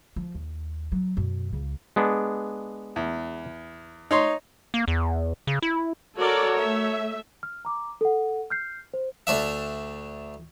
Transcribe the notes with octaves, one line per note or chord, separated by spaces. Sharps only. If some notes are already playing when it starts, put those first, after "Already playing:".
F3
D#2
F#3
F#2 B2
C#2 C#3
G#3 B3 D4
E2
D#4 C#5 C6
A#3
E2
C#3
E4
F#4 A4 A#4 C#5 D5
A3 E5
F6
A#5 D6
A4 F#5
F6 G6 C7
C5
D2 D4 E5